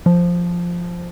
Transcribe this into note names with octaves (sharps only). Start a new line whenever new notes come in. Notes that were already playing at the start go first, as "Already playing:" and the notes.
F3